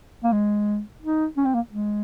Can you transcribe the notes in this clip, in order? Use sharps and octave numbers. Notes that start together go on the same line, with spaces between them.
A#3
G#3
D#4
C#4
C4
A#3
G#3